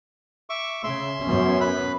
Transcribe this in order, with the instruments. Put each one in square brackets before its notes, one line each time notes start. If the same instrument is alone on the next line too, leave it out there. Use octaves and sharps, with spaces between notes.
[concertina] E5 C#6 D6
[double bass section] C#3 [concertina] E5 C6
[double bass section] F#2 B3 C#4
[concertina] B4 B5